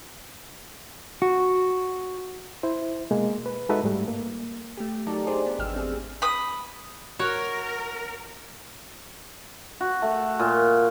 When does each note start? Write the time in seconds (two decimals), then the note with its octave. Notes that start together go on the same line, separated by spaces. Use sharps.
1.22 F#4
2.63 E4 C5
3.11 B2 G#3 A#3
3.46 B4
3.69 G#3 D#4 F#4 A4 B4 E5
3.83 G#2 G3 A3
4.08 A#3
4.77 A3 G4
5.07 F#3 D#4 G4 A4 A#4 D5
5.27 D4 D#4 G4 G#4 C5 D5
5.46 B3
5.59 G#1 F2 G4 E6 F6
5.74 A3 C4 G#4
6.22 B5 D#6
7.19 F#4 A#4 C#5 F#5
9.81 F#4
10.02 A3
10.39 A#2